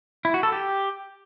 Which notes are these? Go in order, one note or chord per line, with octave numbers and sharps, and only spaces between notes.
E4
F#4
A4
G4